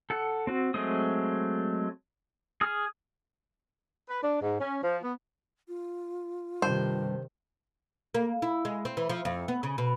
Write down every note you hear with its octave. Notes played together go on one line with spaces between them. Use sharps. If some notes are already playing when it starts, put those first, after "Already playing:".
A4 F#5
C4 F#4
F#3 G#3 A3 C4 D#6
G#4 D#6 F6
B4
D4
G#2
C#4
F3
B3
F4
G2 C3 D#3 C5
A#3
E4
G#3
C4
E3
F3
F2
B3
C#3
B2